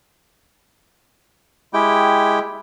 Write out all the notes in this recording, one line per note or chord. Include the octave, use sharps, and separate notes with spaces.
G#3 E4 G4 G5